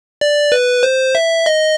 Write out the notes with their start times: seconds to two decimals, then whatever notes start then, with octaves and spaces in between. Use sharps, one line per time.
0.21 D5
0.52 B4
0.83 C5
1.15 E5
1.46 D#5